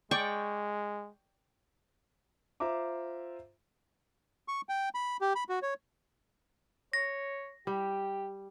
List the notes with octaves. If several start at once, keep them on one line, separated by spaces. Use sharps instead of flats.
G#3 D5 G5 C#6
F4 C5 E5 A#5 D6
C#6
G5
B5
G4
B5
F#4
C#5
C#5 A#6
G3 G4